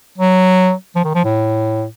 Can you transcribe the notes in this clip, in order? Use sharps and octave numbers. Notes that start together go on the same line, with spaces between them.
F#3
F3
D#3
F3
A2